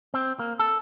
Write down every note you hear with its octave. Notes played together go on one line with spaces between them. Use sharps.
C4
A#3
A4